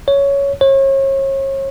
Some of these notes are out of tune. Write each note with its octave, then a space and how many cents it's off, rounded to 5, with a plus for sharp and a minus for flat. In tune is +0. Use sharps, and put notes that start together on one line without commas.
C#5 +10
C#5 -35